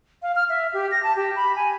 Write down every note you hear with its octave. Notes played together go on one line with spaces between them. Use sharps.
F5
F6
E5
G4
A#6
A5
G4
B5
G#5